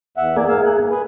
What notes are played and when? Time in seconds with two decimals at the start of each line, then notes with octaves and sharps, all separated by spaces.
0.17 E2 E5 F#5
0.36 F2 E3 A#3 G#4 D5
0.49 G#2 F5 E6
0.65 F#6
0.77 G#2
0.91 G#4 B4